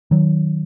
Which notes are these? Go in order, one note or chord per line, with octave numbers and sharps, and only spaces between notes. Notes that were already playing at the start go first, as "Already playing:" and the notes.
D#3 F#3